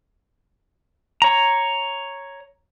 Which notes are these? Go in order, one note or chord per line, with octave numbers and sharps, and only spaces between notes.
C#5 A#5